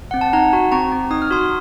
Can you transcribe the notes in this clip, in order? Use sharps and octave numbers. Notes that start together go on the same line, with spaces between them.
C4 F#5
A5
D#4 F#5 A#5
F#4
C4 A#5 C#6
C4
D#4 D#6
F6
F#4 C6 D#6